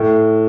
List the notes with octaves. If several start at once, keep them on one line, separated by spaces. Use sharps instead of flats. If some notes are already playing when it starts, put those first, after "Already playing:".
Already playing: A2